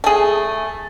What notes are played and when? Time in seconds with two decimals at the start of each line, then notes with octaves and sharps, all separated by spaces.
0.04 A3 G#4